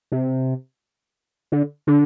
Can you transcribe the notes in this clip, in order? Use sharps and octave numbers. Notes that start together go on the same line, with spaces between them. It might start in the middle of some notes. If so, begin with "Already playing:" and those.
C3
D3
D3